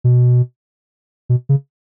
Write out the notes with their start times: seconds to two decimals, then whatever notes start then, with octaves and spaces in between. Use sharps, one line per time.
0.04 B2
1.29 B2
1.49 C#3